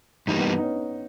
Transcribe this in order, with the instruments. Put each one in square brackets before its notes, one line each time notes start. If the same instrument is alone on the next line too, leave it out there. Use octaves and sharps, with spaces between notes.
[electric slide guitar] G2 E3 G3 A#3 [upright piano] D#4
[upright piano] B3
B3
D#4
C#4